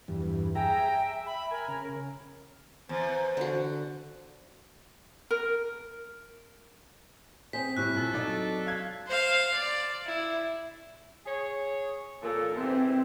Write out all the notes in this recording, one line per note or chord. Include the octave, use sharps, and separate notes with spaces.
E2 G2
G#4 E5 G5 A#5
E5
B5
A#4 G#5
C#3
E2 C5
D3 F#4
A#4
C4 G#4 C5 B6
A2 G3 E5 F#6
A#2 A4
F#3 C4 D#4 D5
F5 G#6
C5 F5
D5
E4
G#4 C#5
A#2 A4
G#2 C3 E3 C4